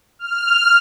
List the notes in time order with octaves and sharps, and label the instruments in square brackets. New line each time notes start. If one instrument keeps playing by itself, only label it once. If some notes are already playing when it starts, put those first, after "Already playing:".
[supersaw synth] F6